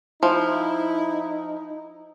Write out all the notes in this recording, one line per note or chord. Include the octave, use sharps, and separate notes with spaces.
F3 D#4 E4